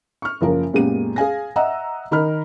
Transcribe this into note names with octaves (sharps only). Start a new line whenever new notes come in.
C#6 F6
F#1 F3 C#4 A#4
F#2 A#2 G#3 B3 G4 D#7
G#4 F5 G#5 A#6
D#5 E5 F#5 A#5 E6
D#3 D#4 A#4 B5 F6